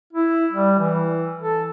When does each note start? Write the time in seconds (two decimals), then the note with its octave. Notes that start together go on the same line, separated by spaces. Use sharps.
0.13 E4
0.52 G3
0.79 E3
1.42 A4